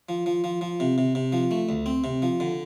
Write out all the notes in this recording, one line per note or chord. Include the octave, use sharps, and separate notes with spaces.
F3
F3
F3
F3
C3
C3
C3
F3
A3
D2
C4
C3
F3
D3